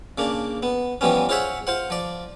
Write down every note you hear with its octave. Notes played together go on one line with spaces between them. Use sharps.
C#3 A#3 D4
B3
E3 F3 G3 B3 C#4
F4 G#4 C5 C#5 E5 F#5
F4 C5 F#5
F3 D5